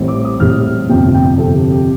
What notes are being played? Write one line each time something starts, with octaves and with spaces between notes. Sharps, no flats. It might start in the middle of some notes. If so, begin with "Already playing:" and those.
Already playing: A1 A2 G3 C4
D6
D#6
A1 A2 G3 C4 F6
G1 F2 C3 G5
G5
G1 F2 C3 A4
G4
G4